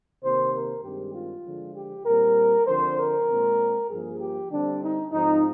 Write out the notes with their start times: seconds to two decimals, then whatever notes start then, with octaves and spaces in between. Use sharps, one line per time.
0.23 C3 D#3 A#3 C5
0.53 A#4
0.84 G2 D#3 G#3 C4 G4
1.15 F4
1.45 D3 F3 G#3
1.76 G4
2.06 A#2 G3 C4 A#4
2.67 D3 F3 C4 C5
2.98 A#4
3.28 A#2 G#3 C4
3.90 G2 F3 A#3 G#4
4.19 G4
4.50 D3 G3 C4 D4
4.81 D#4
5.11 G#2 F3 C4 D#4